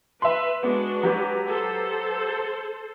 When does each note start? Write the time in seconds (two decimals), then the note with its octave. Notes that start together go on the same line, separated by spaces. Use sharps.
0.22 B4 E5 C6
0.63 G#3 B3 D4 F#4
1.03 F#3 G4 B4
1.50 A4 C5